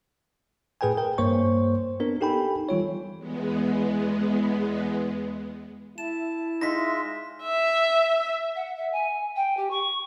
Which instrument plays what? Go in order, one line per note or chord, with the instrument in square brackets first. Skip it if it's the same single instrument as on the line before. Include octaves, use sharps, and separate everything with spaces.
[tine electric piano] A2 G#4 B4 G5 G#5
A#4 G5
G2 A#3 C5 C#5 C#6
B3 D4 A#4
D#4 G4 A4 G5 G#5 B5
E3 G3 F4 C#5
[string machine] E2 G#3 B3
[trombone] E4 [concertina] A5 [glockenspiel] E7
[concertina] G#3 F4 E5 [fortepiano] D#4 [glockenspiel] A#6 B6
[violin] E5
[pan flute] F#5
E5
G#5
G5
G4
C#6